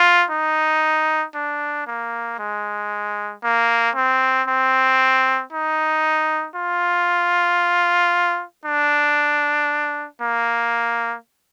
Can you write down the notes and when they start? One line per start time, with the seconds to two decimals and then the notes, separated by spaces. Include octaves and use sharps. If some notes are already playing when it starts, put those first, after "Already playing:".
Already playing: F4
0.31 D#4
1.35 D4
1.87 A#3
2.39 G#3
3.43 A#3
3.96 C4
4.48 C4
5.53 D#4
6.56 F4
8.65 D4
10.22 A#3